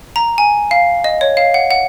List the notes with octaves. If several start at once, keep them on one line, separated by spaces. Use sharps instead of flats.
A#5
G#5
F5
D#5
C#5
F5
F#5
F#5